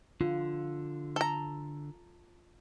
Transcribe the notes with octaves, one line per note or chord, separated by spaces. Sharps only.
D3 F4
A4 A#5